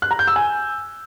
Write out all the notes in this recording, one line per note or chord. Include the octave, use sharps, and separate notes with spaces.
F#6
A#5
G6
E6
G#5